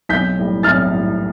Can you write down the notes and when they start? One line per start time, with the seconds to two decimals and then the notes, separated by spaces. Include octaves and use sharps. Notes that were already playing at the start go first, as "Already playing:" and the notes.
0.09 B1 G6 B6
0.37 A2 G3
0.63 B1 F6 A6
0.91 A2 G3